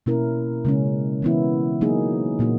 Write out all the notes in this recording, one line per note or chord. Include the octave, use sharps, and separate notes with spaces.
B2 A#3 C#4 E4 A#4
C#3 G#3 C#4
E3 B3 E4
F#3 A#3 D#4 G#4
A#2 A#3 D#4 F#4